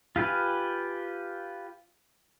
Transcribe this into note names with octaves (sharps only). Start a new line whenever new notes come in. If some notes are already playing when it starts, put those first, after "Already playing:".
F4 G4 B4 G#5 F6